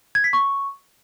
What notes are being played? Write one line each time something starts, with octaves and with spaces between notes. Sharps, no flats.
G#6
B6
C#6